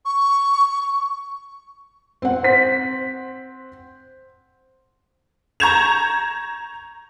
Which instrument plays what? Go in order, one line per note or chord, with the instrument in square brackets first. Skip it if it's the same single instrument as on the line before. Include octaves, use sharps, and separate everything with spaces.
[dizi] C#6
[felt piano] C4 F#5
[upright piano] C5 B6
[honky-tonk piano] A#5 C#6 G6 G#6 E7 F7